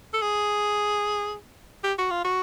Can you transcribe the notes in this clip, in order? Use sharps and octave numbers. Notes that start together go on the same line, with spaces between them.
A4
G#4
G4
F#4
F4
F#4